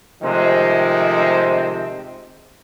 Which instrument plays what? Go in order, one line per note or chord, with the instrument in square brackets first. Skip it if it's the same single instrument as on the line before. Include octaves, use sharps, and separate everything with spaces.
[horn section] C3 D#3 F3 G#3 A3 C4